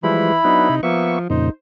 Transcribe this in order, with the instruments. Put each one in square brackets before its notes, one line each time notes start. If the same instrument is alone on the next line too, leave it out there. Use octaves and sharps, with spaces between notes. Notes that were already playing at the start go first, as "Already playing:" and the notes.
[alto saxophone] E3 [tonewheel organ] F3 G3 G#3 [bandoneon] E4 B5
[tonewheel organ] F#3 B3 D4 [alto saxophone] D#4
[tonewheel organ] C3
[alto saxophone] F3 [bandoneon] A#3 E5 [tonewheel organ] B3 C#6
[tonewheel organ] F2 A#2 C#3 [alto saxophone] D#4 [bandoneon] C5